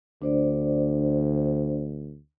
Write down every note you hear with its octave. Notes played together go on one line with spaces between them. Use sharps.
D2 D4 C5 D5